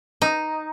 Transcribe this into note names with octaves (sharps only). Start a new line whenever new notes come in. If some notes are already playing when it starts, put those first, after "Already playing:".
D#4